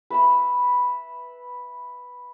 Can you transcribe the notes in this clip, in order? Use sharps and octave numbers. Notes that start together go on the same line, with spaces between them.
B4 E5 B5